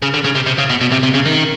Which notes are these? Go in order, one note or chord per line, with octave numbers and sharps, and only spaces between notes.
C#3
D3
C#3
C3
C3
C#3
B2
B2
C3
C3
C#3
D#3